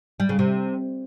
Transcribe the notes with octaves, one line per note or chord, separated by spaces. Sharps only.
G3
C#3
C3